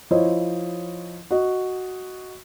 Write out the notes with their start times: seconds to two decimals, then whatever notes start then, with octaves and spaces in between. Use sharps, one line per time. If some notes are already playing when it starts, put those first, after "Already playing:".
0.11 F3 E4 C5 C#5 D#5
1.31 F#4 D#5